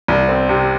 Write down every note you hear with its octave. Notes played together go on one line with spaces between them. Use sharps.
C2
C4
C3